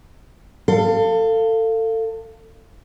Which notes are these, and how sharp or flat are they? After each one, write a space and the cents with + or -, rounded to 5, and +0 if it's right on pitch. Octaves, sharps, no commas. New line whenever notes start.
A4 +25 F5 -10